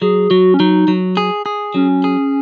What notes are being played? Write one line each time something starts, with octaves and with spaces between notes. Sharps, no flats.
F#3 G#4
F#3 F#4
C#4
F#3 D#4
F#3
G#4
G#4
F#3 C#4
G#4